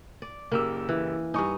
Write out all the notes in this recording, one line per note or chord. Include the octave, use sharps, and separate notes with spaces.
D5
F#1 A#3 G4 E6
E3
G2 D#4 G#5 C#6